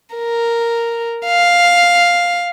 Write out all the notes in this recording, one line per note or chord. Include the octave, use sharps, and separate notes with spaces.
A#4
F5